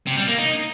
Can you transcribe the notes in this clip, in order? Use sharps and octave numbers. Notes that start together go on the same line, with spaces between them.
C3
G3
A#3
D#4